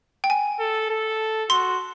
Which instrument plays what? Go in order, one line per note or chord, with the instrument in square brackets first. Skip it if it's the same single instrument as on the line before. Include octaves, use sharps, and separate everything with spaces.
[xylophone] G5
G#5
[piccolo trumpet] A4
A4
[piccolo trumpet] F#4 [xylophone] C6